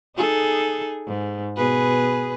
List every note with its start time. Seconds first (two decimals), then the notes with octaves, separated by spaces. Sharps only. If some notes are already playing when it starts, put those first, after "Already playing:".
0.16 D#4 G#4 A4
1.07 G#2
1.57 B2 G#4 B4